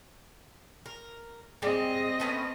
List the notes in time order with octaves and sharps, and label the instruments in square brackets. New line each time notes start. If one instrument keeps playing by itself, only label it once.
[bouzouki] A#4
[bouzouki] G3 G#3 [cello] C4 D#5
[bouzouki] A3 B3 C#4